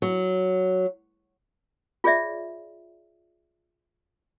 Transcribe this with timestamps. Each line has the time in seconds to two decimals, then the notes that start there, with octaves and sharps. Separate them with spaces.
0.02 F#3
2.04 F4 G#4 C#5 D5 E5